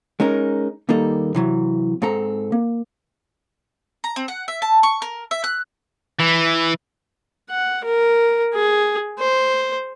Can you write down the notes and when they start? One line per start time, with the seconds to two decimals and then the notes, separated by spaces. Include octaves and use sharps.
0.20 G#3 C#4 D#4 A#4
0.89 D#2 G3 A#3 D#4 A4
1.35 C3 E3 F#3
2.02 G#2 C4 A4 A#5
2.52 A#3
4.04 A#5
4.16 C4
4.28 F#5
4.48 E5
4.62 A5
4.83 C#6
5.02 A#4
5.31 E5
5.44 F#6
6.19 E3
7.50 F#5
7.85 A#4
8.55 G#4
9.19 C5